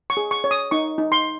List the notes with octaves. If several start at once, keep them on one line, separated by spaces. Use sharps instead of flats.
C#6
G#4
C#6
C#5
D#6
D#4 C#6
D#4
C6